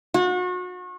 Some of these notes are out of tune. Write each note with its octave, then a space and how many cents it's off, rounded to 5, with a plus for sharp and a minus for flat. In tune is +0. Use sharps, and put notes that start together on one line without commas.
F#4 -35